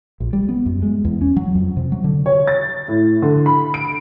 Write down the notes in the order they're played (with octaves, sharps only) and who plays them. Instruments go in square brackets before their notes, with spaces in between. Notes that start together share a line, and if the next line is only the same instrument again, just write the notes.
[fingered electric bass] A#1
G3
B3
F#2
G#3
E2
C#4
F#3
F2
C3
F#3
D3
[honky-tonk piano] C#5
A6
A2
D3
B5
D7